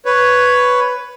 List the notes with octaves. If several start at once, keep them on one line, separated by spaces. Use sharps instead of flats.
B4 C#5